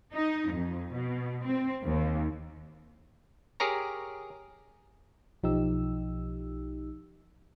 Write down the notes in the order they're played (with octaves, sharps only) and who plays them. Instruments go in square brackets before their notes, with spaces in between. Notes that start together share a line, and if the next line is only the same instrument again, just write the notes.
[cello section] D#4
F2
B2
C4
D#2
[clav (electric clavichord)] G4 G#4 A#4 C#5 A#5
[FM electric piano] B1 F3 D#4 G4 E6